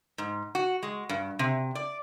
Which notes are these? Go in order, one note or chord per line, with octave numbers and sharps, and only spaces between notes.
G#2
F#4
G#3
G2
C3
D5